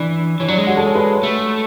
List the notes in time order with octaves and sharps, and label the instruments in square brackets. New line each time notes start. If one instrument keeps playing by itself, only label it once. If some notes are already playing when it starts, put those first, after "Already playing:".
Already playing: [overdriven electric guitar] E3 [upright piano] D4 D5
[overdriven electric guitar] E3 [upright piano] C#5
[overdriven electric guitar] F#3 [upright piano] D4 D5
[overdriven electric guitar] G#3
[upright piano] F#4 F#5
A4 A5
C#5
B4
[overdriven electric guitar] A3